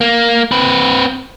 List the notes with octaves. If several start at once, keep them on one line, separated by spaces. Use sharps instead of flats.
A#3
C4 B4